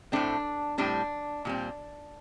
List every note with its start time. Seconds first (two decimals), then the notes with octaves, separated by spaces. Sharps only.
0.12 A2 A3 C4 D4
0.78 A2 G3 C4 D4
1.45 A#2 G3 C4